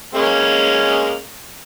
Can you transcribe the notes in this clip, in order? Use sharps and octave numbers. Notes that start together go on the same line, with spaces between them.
G#3 A#3 C#4